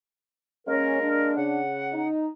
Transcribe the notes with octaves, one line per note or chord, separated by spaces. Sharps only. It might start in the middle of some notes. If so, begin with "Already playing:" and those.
G#3 A#3 C#4 A#4
D4
C#3 F#5
D#4